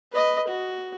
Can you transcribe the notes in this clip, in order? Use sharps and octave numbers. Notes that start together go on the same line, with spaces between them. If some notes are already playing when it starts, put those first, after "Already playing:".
B4 D#5
F#4